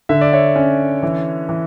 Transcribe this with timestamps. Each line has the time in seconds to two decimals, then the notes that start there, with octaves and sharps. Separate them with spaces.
0.09 D3 E5
0.21 D5
0.33 C#5 E5
0.56 C#4
1.03 E3
1.49 E3